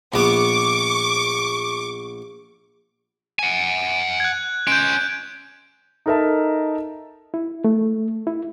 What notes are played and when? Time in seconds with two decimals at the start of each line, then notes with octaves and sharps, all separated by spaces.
0.14 A#1 B3 C#6 D6
3.39 F#5 G#5
4.20 F#6 G#6
4.67 C#4 C6 G6 D7
6.06 D#4 A4 A#4 D#5 E5 A5
7.34 E4
7.64 A3
8.27 E4